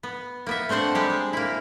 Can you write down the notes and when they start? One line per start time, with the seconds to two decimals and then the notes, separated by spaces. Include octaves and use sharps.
0.03 B3
0.47 A#3 B3 E5
0.69 A3 C4 D4 C5 F#5
0.95 G3 G#3 G4
1.10 G#3
1.33 A#3 E4